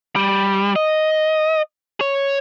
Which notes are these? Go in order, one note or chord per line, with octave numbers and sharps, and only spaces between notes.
G3
D#5
C#5